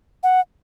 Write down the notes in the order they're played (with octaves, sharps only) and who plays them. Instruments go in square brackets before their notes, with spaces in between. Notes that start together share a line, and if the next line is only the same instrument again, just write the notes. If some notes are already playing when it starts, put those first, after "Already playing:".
[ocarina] F#5